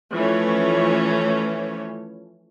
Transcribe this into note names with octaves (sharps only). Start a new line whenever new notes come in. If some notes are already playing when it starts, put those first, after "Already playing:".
E3 F3 A3 C#4 C#5